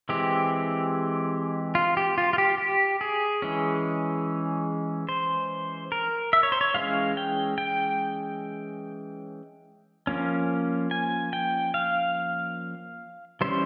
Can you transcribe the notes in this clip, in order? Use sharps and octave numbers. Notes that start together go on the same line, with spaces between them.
E3 G#3 C4 G4
F4
G4
F4
F4
G4
G4
G#4
E3 G#3 C#4
C5
A#4
E5
C#5
C5
C#5
E3 G#3 C#4 F5
G5
G5
F3 A#3 C#4
G#5
G5
F5
E3 G3 C#4 C5